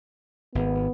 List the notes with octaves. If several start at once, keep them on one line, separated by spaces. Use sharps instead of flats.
G#1 B3